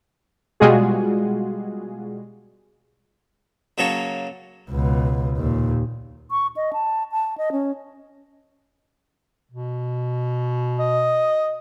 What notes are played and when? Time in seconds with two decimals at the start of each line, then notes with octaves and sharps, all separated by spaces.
0.60 B2 G3 G#3 F4 F#4 G#4
3.78 C#3 F#3 A#3 A4 C#5
4.71 C#2 B2
5.37 D#2 A#2
6.31 C#6
6.56 D#5
6.73 A5
7.12 A5
7.38 D#5
7.52 C#4
9.52 B2
10.79 D#5